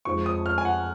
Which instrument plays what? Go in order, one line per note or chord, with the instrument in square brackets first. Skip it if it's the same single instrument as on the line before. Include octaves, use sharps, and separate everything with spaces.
[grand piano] F2 F3 G#3 [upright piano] C#6
[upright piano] D#6
F6
G#5
F#5